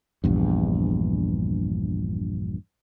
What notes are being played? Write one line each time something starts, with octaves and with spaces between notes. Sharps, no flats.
A#1 E2 G2